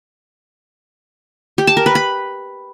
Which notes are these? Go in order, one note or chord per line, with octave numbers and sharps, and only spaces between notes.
G4
A5
A#4
B4
B5